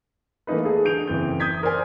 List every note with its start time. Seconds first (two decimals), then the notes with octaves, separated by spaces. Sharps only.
0.47 E3 A3 A#3 D#4 B4
0.64 G#4 A4
0.85 D3 G6 D7 F7
1.07 F#1 E3 C4 G6
1.40 D#6 G6 G#6 B6
1.63 A#4 C5 D5 G#5